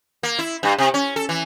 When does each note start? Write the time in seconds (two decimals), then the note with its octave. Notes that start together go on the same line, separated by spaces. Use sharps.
0.23 A#3
0.39 E4
0.63 G2
0.78 C3
0.94 C#4
1.16 A4
1.29 E3